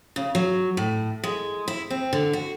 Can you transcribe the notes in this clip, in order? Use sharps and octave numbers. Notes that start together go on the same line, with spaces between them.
C#3
F#3
A2
G#3
E4
C4
D3
F#4